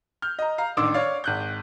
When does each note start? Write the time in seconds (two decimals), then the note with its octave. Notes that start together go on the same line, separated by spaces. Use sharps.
0.22 F6 G6
0.39 D#5 A#5
0.58 F5 A#5
0.77 A1 D#3 D4 C6 D6 E6
0.94 C#5 D5 F5
1.24 G#1 F#6 G6